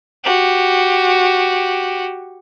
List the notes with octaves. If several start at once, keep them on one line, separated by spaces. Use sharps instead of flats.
F#4 G4